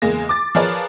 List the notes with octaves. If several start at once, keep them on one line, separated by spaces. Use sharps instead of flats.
E2 C#3 G#3 A#3 A#6
D6 A6
F3 G#4 A#4 B4 C#5 D5